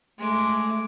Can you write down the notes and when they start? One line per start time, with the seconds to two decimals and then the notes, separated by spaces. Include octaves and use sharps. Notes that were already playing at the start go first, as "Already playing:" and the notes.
0.19 G#3 A3 D6